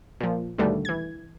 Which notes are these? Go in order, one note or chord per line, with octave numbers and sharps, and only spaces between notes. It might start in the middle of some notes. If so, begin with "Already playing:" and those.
A#2 F3
D#2 B2 D3 G3 A3
E3 G#6